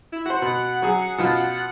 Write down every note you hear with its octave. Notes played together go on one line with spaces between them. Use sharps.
E4
F#4 C5 F#5
B2
F#3 G#4
B2 F3 F4